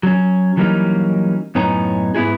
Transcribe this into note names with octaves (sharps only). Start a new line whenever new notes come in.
F#3 C#4
E3 F#3 G3 A#3 C#4 D#4
F#2 A2 B3 C#4 D#4 A#5
G#2 B3 E4 F#4 G#4